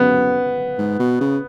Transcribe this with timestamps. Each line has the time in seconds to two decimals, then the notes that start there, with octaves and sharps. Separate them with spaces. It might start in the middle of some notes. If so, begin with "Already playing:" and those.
Already playing: F#2 B3
0.78 G#2
1.00 B2
1.21 C#3